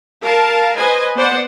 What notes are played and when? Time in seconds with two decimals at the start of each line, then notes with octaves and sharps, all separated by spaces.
0.23 A#4 F5 A5
0.76 B4 C5 D#5 G#5
1.16 B3 C5 D5 F#5